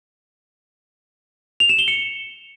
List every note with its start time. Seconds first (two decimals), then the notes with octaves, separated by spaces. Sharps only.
1.60 F7
1.69 E7
1.79 G7
1.88 C#7